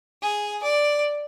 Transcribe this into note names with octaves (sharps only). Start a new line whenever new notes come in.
G#4
D5